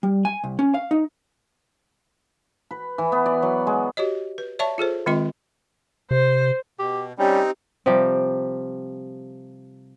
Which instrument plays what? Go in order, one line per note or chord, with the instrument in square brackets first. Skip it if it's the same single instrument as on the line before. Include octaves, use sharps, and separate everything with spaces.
[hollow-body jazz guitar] G3
G#5
C2
C#4
F5
D#4
[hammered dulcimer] B4
E3
B3
D5
F#3
G#3
[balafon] F#4 G4 C#5 D#5
B4
C#5 D5 E5 A5 C#6
F4 G#4 A4 C5
D#3 G#3 C4 F4 D#5 C6
[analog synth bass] C3 [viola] C5
[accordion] B2 [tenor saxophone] G4
[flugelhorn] G3 [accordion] C4 D#4 [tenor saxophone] C#4 [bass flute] G4
[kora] C3 F3 G3 G4